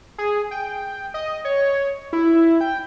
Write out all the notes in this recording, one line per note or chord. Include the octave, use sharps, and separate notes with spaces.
G#4
G5
D#5
C#5
E4
G5